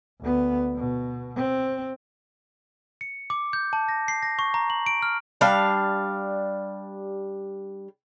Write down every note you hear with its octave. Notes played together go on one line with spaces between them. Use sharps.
D2 B3
B2
C4
C#7
D6
G6
A5
A#6
C7
A#6
C#6
A#5
F#7
D7
F6
G3 D4 F5